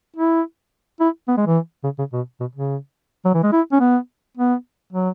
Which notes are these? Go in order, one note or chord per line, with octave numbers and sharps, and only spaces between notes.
E4
E4
B3
G#3
E3
C#3
C#3
B2
B2
C#3
F#3
E3
G#3
E4
C#4
B3
B3
F#3